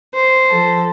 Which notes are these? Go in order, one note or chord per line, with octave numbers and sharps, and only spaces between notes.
C5
F3 A4